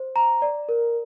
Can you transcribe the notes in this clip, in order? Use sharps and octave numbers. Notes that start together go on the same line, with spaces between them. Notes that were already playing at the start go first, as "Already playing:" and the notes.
Already playing: C5
A#5
D5
A#4